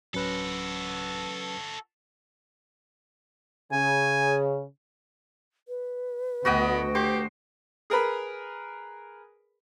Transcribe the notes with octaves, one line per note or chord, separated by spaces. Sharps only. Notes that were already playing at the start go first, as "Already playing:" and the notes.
D1 F#3 C#4 F#4 A4 B4
C#3 G#5
B4
D2 B3 F#4 D#5 G5
G4 C5
G#4 A#4 B4 B5